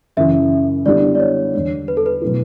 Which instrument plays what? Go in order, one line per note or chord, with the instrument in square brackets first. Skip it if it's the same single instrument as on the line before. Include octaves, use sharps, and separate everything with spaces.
[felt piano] F#2 C#3 E3 [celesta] E5
[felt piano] D3 G3 B3 E4 G4 [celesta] D5
[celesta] D5
C#5
[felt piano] E2 D3 G3 D4
[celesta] B4
A4
B4
[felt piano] B2 F#3 A3 E4